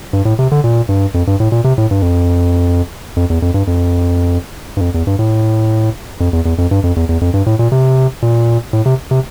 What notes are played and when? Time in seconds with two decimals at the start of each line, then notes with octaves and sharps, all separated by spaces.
0.13 G2
0.25 A2
0.39 C3
0.52 D3
0.64 A#2
0.89 G2
1.14 F2
1.27 G2
1.40 A2
1.52 A#2
1.64 C3
1.78 A2
1.91 G2
2.02 F2
3.16 F2
3.30 E2
3.42 F2
3.54 G2
3.67 F2
4.77 G2
4.81 F2
4.94 E2
5.07 G2
5.19 A2
6.20 F2
6.33 E2
6.45 E2
6.58 F2
6.71 G2
6.83 F2
6.96 E2
7.09 E2
7.21 F2
7.34 G2
7.46 A2
7.59 A#2
7.72 C3
8.22 A#2
8.73 A2
8.86 C3
9.11 C3